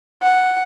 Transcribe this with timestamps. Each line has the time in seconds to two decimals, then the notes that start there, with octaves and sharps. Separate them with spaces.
0.22 F#5